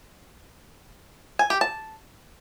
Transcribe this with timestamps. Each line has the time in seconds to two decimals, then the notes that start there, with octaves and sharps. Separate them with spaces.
1.39 G#5
1.50 G4
1.61 A5